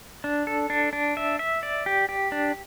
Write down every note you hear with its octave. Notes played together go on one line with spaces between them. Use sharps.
D4
A4
D4
D4
E5
E5
D5
G4
G4
D4